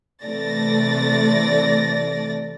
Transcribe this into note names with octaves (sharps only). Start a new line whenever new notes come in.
C3 E3 A3 D5 A6 A#6